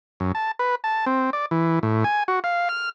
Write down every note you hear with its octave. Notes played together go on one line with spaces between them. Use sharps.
F#2
A5
B4
A5
C4
D5
E3
A2
G#5
F#4
F5
F6